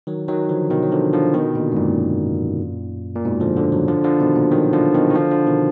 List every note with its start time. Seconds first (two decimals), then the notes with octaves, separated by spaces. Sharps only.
0.07 D#3 F#3
0.28 D#3 F#3
0.49 D3 F3
0.70 B2 D#3
0.83 F#3
0.92 D3 F3
1.13 D3 F3
1.34 B2 D#3
1.55 A#2 D3
1.72 G#2
1.76 F#2 A#2
3.15 A#2
3.25 G#2 B2
3.40 D3 F3
3.57 D3 F3
3.72 D#3 F#3
3.88 D3 F3
4.04 D3 F3
4.20 B2 D#3
4.35 A#2 D3
4.52 D#3 F#3
4.73 D3 F3
4.94 B2 D#3
5.11 D#3
5.15 D3 F3
5.31 D3 F3
5.47 B2 D#3